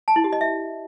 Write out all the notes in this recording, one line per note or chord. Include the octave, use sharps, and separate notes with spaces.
A5
E4
G4
D#5
E5